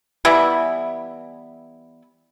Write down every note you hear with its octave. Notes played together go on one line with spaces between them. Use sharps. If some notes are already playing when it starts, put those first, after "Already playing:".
E3 G3 B3 E4